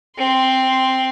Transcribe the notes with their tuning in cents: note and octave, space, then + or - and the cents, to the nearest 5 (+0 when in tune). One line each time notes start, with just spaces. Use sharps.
C4 +0 C6 +0